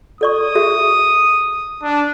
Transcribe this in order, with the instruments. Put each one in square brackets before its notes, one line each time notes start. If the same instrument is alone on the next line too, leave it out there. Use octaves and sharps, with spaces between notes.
[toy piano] A4 D5 C#6 [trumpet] D#6
[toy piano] F#4 G#4 E5
[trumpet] D4